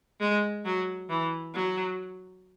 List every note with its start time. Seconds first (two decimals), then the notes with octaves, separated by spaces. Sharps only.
0.20 G#3
0.65 F#3
1.09 E3
1.54 F#3